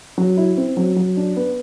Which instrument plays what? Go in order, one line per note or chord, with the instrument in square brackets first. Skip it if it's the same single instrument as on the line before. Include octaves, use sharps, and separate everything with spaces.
[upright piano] F#3
E4
C4
F#3
F#3
D4
B3